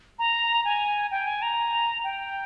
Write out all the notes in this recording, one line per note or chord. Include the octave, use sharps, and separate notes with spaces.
A#5
G#5
G5
G#5
A#5
G5